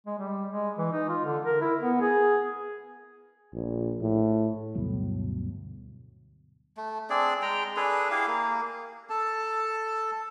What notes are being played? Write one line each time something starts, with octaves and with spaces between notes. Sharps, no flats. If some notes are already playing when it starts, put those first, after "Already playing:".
G#3
G3
G#3
E3
D#4
F4
D3
A#4
E4
B3
G#4
A#1
A2
D2 G2 B2 F#3
A3
C4 D4 G#4 D5
G#3 G5 A#5
D4 G#4 A4 B4
E4 G4 G#4 F5
A#3
A4 A5